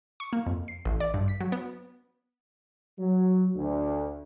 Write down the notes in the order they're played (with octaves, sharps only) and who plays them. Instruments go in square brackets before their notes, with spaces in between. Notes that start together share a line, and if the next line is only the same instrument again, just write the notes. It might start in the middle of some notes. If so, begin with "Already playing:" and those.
[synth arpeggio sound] C#6
A#3
F2
C7
A1
D5
G2
B6
F#3
B3
[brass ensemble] F#3
D2